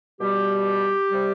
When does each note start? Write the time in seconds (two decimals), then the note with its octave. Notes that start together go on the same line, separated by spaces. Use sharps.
0.20 B2 G3 G4
1.11 C3 G3